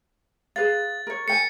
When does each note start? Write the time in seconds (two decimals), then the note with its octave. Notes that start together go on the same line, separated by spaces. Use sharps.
0.56 G#4 B4 F5 A6
1.07 A#4 C#5
1.28 A#4 G5 G#5 C#7